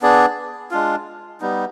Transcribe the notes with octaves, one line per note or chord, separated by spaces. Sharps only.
B3 D4 G#4 D5
G#3 D4 F4
G3 B3 D#4